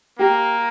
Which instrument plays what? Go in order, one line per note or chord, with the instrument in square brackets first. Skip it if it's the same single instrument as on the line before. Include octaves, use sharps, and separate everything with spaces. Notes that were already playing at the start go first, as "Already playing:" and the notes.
[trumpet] A#3 [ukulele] G4